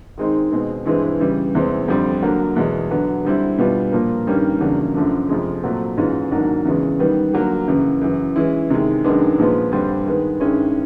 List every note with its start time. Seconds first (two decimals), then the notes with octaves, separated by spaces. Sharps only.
0.18 D#3 G#3 C4 D#4
0.52 B2 G#3 C4
0.85 G2 E3 G#3 C4 E4
1.20 C#3 E3 G3
1.55 E2 C3 E3 G#3 C4
1.88 F2 D3 G3 C4
2.22 D3 F#3 A#3
2.56 E2 B2 G#3
2.91 D3 F#3 B3
3.25 D3 G3 C4 E4
3.58 B2 G3 B3 D4 F4
3.92 A#2 F3 A#3
4.27 G2 D#3 G3 A#3 C#4
4.60 E2 C#3 F#3 A#3 D4
4.94 F#2 D3 F3 A3 D4
5.29 F2 C3 F3 G#3
5.63 A#2 F#3 A3 C4
5.97 G#2 E3 G#3 C#4 F4
6.31 G#2 D#3 F#3 A#3 D4
6.65 E2 C#3 E3 G#3
6.99 D#3 G3 B3
7.34 D3 F#3 A#3
7.67 F#2 C#3 E3
8.01 F#2 C#3 E3
8.36 E3 G#3 C#4 E4
8.70 C3 D#3 G#3
9.04 F#2 D#3 G#3 B3 D4
9.38 A#2 F3 G#3 B3
9.72 G2 D3 G3 C4
10.06 D#3 G#3 B3
10.40 G2 D#3 G#3 C#4 E4